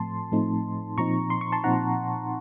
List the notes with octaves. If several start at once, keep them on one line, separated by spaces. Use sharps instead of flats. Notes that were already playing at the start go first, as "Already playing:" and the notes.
Already playing: A2 F3 A3 C4 A5 C6
A2 F3 A3 C4 D#4
A#2 F3 C4 D#4 A#5 C#6
C6
C#6
A5 C6
A#2 F3 C4 D#4 F#5 A#5